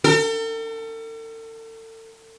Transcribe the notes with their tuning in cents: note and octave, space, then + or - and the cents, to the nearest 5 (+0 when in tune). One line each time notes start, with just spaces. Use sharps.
A4 +40